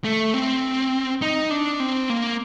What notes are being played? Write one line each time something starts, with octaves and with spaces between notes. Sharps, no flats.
A3
C4
D#4
D4
C4
A#3